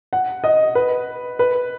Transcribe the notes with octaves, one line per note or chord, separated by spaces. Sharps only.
F#5
D#5
B4
B4